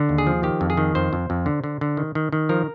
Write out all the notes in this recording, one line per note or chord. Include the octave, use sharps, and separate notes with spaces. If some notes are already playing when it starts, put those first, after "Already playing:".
Already playing: D3
D#2
G#4
F3
D#3 G4
F2
G#4
D#3
F2 C5
F2
F2
D3
D3
D3
D#3
D#3
D#3
F3 A#4